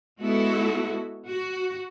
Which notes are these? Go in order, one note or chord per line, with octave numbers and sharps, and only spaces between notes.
G#3 B3 E4 F#4 A4
F#4